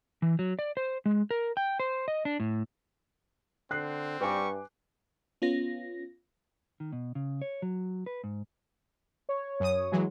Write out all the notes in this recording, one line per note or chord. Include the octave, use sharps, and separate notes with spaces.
E3
F#3
D5
C5
G#3
A#4
G5
C5
D#5
D4
A2
D3 C4 F#6 C7
G2 G3 B4 G#5 C#6 D6
B3 C#4 F4 A#6
D#3
B2
C#3
C#5
F#3
B4
G#2
C#5
F#2 D#6
E3 F#3 G#3